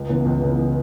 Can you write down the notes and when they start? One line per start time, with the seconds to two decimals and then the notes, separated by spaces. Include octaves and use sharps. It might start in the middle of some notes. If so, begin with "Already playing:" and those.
Already playing: C#2
0.09 C#3 E3 B3
0.26 C#2
0.42 C#3 E3 B3